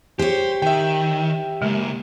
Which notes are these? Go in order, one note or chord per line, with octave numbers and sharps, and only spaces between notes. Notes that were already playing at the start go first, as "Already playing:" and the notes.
G4 C5 C#5
D#3 E5 G5
C#3 G#3 A#3